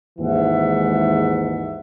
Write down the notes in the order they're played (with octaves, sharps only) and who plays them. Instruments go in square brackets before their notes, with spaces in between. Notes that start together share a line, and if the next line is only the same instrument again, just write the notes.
[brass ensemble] G#1 D#2 G#2 E3 E5 F#5